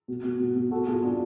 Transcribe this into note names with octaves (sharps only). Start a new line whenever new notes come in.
B2
B2
B2
B2
B2 F#4 A4
B2 F4 G#4
B2 D4 F#4